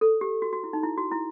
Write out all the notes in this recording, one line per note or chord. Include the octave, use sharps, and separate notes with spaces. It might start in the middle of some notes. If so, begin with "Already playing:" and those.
A4
G4
F#4
F#4
E4
D#4
E4
F#4
E4